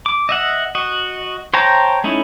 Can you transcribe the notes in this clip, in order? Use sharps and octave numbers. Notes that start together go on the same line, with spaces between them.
D6
D#5 E5 F#5
F#4 D#5
C5 C#5 G5 A5 A#5
A3 C#4 D#4 E4